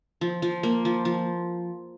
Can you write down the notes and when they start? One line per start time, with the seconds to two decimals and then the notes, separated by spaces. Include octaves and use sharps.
0.21 F3
0.42 F3
0.63 A#3
0.85 F3
1.05 F3